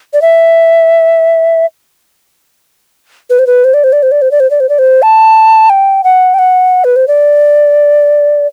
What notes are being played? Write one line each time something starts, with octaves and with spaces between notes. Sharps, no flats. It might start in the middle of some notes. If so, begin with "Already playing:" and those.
D5
E5
B4
C5
B4
C5
D5
C5
D5
C5
D5
C5
D5
C5
D5
C5
D5
C5
A5
G5
F#5
G5
F#5
B4
C5
D5